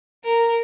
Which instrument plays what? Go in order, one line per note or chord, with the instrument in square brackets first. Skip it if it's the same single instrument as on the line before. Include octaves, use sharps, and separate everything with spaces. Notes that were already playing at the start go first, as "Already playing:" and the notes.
[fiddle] A#4